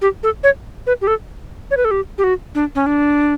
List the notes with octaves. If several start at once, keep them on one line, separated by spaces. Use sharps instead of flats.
G4
A4
C#5
B4
G4
A4
C#5
B4
A4
G4
G4
F#4
D4
C#4
D4